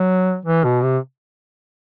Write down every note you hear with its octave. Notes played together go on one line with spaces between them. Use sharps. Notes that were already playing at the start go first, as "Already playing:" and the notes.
Already playing: F#3
E3
B2
C3